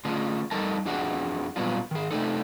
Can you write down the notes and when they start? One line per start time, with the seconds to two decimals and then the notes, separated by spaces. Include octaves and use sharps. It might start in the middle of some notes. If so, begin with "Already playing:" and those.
0.05 D3 A3 C#4 D4 F4 G#4
0.51 F2 G3 D#4 A4 A#4 A5
0.85 F2 F3 D4 F#4 G#4 F#5
1.56 A#2 F#3 G3 B3 D4 F4
1.91 D#3 G#4
2.11 C3 A3 B3 D4 D#4 A4